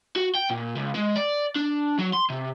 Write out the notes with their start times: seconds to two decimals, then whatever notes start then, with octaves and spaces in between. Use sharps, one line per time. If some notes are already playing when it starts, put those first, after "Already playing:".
0.16 F#4
0.35 G5
0.50 A#2
0.77 C#2
0.95 G#3
1.16 D5
1.56 D4
1.99 F#3
2.13 C6
2.30 C3